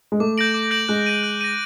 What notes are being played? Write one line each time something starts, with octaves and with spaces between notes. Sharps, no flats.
G#3
A3 D6
G6 A#6 D7 F#7
D6
G6 A#6 D7 F#7
G#3 F#6
A#6 D#7
F#6
A#6 D#7